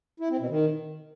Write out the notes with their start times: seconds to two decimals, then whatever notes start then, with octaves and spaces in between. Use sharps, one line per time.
0.20 E4
0.30 C4
0.40 B2
0.50 D#3